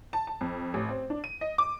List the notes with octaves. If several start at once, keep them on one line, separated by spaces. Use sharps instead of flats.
A5
A5
F2
A1
C4
D4
D#7
D#5
D6